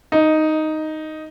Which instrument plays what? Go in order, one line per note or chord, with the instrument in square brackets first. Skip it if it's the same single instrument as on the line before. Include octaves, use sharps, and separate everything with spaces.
[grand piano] D#4